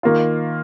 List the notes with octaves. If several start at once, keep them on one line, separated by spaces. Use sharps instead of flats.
D#3 A#3 F4